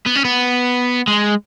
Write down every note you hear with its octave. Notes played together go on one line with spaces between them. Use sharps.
B3
C#4
B3
G#3